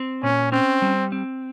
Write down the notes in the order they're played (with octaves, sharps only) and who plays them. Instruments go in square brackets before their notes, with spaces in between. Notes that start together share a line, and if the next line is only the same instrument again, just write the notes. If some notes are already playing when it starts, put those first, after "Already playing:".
Already playing: [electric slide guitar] C4
[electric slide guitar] A#2 [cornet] C#4
[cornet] C4 [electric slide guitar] C#4
[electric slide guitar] G3
C4